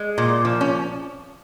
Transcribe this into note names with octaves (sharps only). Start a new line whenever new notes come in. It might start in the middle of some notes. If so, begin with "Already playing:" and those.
Already playing: G#3
A#2
F3
C#4